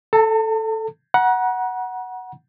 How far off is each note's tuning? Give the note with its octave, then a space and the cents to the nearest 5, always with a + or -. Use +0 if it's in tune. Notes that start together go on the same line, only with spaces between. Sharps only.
A4 +0 A5 +45
F#5 +0 A#5 +40